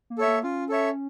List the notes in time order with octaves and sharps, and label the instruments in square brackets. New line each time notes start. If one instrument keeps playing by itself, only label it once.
[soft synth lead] A#3
[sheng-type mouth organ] A4 C#5 E5
[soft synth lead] A#3
[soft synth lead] C#4 [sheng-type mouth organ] F4
[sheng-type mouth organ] A4 C#5 E5